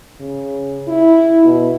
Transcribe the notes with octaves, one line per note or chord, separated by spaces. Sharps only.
C#3
E4
B2